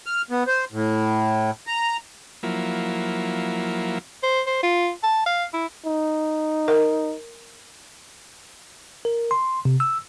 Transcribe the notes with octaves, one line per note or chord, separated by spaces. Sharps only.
F6
B3
C5
A2
A#5
F3 F#3 A#3 E4
C5
C5
F4
A5
F5
E4
D#4
A#4
A#4
C6
C3
E6